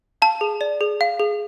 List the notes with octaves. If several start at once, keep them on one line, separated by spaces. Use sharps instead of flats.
F5 A5
G#4
D5
G#4
F5
G#4